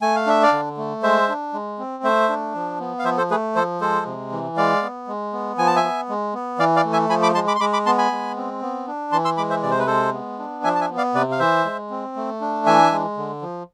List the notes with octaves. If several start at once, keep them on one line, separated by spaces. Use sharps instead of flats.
A3 G#5
F5
D4 E5
D5 F5
D3
A3
G#3 C5 E5
D4
G#3
C4
A3 C5 E5
D4
F3
B3
F5
F3 C5 E5
A4 C5
A3 G#4 B4
F3 A4 C5
G#3 A4 C5
C3
E3
G#3 D5 F5
B3
G#3
B3
F3 G#5
A5
E5 G#5
B3
G#3
B3
E3 D5 F5
D5 F5
A3
E5 G#5
F3 G#5 B5
B5 D6
G#3 A5 C6
B5 D6
C6
G#3 B5 D6
B5 D6
B3 A5 C6
G#5 B5
G#3
C4
B3
D4
E3 A5 C6
C6 E6
G#3 B5 D6
C5 E5
C3 D5
C5
B4
G#3 A4 C5
B3
D4
F3 E5 G#5
A5
E5 G#5
B3
D5 F5
C3 B4 D5
F5
E3 C5 E5
G#3
C4
A3
D4
E3 E5 G#5
G#3
D3
F3